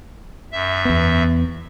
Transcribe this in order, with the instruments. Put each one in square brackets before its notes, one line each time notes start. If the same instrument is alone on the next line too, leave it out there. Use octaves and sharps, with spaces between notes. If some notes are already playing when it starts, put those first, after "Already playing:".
[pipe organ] F#2 E5
[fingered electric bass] E2 B3